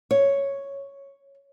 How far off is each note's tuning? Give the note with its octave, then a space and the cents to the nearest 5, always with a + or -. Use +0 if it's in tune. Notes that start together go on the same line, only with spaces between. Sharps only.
C#5 +0